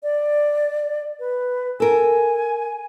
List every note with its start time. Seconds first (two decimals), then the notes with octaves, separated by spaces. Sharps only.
0.03 D5
1.19 B4
1.80 A4 A#4 G#5